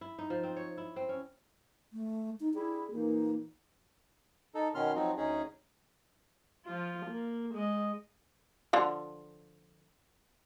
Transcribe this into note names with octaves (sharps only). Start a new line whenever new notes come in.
E4
D#4
F3
C4
C#5
E4
C4
C#4
A3
D#4
G3 D4 E4 G#4
A#2 E3 A#3 D#4
D#4 A4
B2 D#3 B3 C#4 C6 F6
F3 F#3 C4 D#4
D2 C#4 D#4 G#4
F3 F4
A#3
G#3 D#5
D3 F3 F4